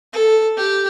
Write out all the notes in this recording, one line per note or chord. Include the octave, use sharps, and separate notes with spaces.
A4
G4